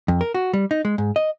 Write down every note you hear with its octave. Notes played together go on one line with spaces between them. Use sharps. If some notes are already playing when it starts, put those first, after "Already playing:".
F2
A#4
F#4
G3
D#4
G#3
G#2
D#5